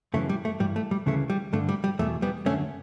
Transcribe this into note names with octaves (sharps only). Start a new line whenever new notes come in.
F#2 C#3 E3 A3
G3
A3
G2 E3 G3
A3
G3
D2 C#3 E3 A3
G3
G2 D3 A3
G3
G3
E2 B2 A3
G3 B3
F#2 D3 A3 C#4